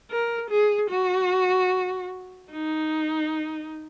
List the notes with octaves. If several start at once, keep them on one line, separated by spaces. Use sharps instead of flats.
A#4
G#4
F#4
D#4